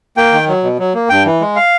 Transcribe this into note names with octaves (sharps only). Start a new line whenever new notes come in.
A#3 G5
D#3
F#3
B2
F#3
A#3
G2 G5
E3
G#3
F5